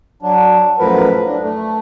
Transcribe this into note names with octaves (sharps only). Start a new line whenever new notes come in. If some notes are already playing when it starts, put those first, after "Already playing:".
F#3 D4
F#2 A2 F3 F#3 A#4 B4
D4
A3